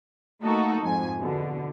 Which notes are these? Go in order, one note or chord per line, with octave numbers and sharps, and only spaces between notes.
A3 A#3 D#4 F#4 A4
F2 G#2 G#5
E2 B2 D3